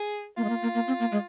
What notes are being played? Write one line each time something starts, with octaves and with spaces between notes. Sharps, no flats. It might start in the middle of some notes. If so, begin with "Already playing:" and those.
Already playing: G#4
A#3 F4
G#3
A#3
A#3
A#3
C4
A#3
G#3